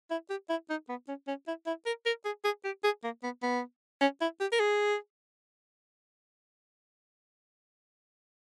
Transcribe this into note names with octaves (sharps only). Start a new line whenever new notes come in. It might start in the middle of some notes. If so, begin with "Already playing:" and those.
E4
G4
E4
D#4
B3
C#4
C#4
E4
E4
A#4
A#4
G#4
G#4
G4
G#4
A#3
B3
B3
C#4
E4
G4
A#4
G#4